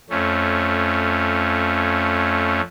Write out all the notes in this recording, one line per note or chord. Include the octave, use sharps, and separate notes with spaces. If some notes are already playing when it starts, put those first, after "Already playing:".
F2 A3 C#4